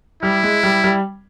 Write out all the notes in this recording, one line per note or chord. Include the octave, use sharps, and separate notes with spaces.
G3 E4
G#3
G3
G3